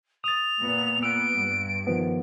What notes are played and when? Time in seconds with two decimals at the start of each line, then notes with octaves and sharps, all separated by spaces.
0.24 D#6 A6 F7
0.61 A#2 B3
1.03 B3 E6 F#6 D7
1.39 G2
1.87 D#3 F3 B3